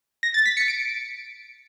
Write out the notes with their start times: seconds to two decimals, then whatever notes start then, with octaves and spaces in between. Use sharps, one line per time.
0.23 A#6
0.34 A6
0.46 B6
0.57 C#7
0.68 D7